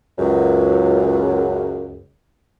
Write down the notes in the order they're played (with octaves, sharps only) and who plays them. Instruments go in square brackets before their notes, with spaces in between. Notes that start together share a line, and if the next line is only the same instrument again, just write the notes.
[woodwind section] C#2 F#2